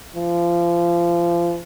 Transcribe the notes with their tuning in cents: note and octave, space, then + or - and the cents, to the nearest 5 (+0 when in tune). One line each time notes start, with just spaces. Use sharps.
F3 -25